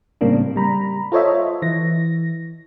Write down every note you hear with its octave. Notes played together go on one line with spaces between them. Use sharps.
A2 C#3 G3 A#3 C4 D4
G3 A#5 B5
F4 A4 C5 C#5 D#5 E5
E3 A#6